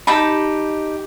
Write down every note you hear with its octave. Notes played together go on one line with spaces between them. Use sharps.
D#4 G4 A5 B5